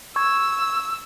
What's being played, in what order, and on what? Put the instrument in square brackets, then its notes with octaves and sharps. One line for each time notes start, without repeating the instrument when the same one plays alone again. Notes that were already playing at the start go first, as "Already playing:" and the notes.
[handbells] C#6 G#6 [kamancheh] E6